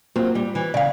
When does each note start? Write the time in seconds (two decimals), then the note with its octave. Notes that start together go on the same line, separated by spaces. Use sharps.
0.16 F#3 A#3 C4 F4
0.35 G3
0.55 E3 G3
0.74 C#3 D5 F5